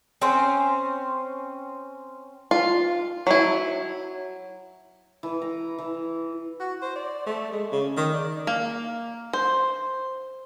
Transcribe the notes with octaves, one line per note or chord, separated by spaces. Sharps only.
C4 C#4 C5
F4
F#3 E4
E3
A#5
E3
F#4
C5
D5
A3
G#3
C#3
D#3
D5
A#3
C5